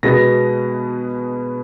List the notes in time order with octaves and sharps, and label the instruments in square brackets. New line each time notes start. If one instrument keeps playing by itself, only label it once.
[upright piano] B2 G#3 B3 A#6